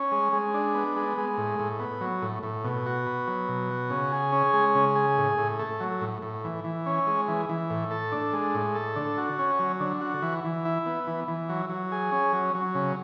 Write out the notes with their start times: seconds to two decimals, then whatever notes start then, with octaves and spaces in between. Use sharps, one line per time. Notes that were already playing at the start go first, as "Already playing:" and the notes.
Already playing: C#4
0.12 G#3
0.33 G#3
0.54 D4
0.74 B3
0.96 G#3
1.17 G#3
1.38 A2
1.59 A2
1.80 B3
2.01 F#3
2.22 A2
2.43 A2
2.64 B2
2.86 F#4
3.07 B3
3.28 F#3
3.49 B2
3.70 F#4
3.90 C#3
4.12 G#4
4.32 C#4
4.53 G#3
4.75 C#3
4.95 G#4
5.18 A2
5.38 A2
5.59 A3
5.80 F#3
6.01 A2
6.22 A2
6.44 E3
6.64 E3
6.86 C#4
7.07 G#3
7.28 E3
7.49 E3
7.70 A2
7.91 A4
8.12 D4
8.33 G#3
8.54 A2
8.75 A4
8.96 D3
9.18 F#4
9.39 C#4
9.59 F#3
9.80 D3
10.01 F#4
10.22 E3
10.44 E3
10.65 E4
10.86 B3
11.07 E3
11.28 E3
11.49 F#3
11.70 F#3
11.92 G#4
12.12 C#4
12.33 F#3
12.54 F#3
12.75 C#3